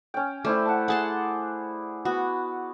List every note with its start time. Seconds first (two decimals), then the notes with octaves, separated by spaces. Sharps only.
0.14 C#4 G5
0.45 A3 E4 C5 D5
0.66 F#5 A5
0.88 G#4 F#5 A5 C6
2.05 B3 F#4